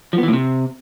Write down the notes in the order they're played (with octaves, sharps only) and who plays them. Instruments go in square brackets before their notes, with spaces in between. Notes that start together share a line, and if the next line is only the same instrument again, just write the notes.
[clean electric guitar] F3
B3
E3
A2
C3